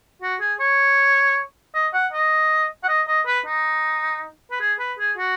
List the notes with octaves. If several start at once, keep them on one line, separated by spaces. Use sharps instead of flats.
F#4
G#4
C#5
D#5
F#5
D#5
F#5
D#5
D#5
B4
D#4
B4
G#4
B4
G#4
F#4